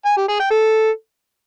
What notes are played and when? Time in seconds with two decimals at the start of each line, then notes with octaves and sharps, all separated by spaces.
0.06 G#5
0.17 G4
0.28 G#4
0.39 G5
0.51 A4